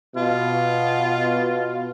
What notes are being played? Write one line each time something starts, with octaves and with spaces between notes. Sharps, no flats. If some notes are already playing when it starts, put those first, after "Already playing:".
B2 F4